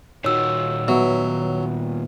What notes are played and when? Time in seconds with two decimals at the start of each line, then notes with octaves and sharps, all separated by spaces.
0.24 A#2 D#3 D#4 F#4 C#5 E6
0.88 F#3 B3 E5